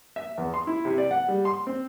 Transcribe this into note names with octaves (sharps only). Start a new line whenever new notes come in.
E5
E2
C6
E4
C3
D5
F#5
G3
C6
C4